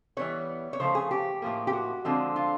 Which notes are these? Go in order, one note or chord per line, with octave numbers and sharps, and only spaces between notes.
E3 G3 B3 C#5
C#5
C#3 F3 A3 C5
G#4
G4
A2 F3 A#3
G4
F#4
D3 F3 G#3 C4
F4